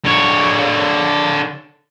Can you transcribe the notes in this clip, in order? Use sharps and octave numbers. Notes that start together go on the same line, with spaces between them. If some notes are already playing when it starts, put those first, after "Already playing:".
D3 C#5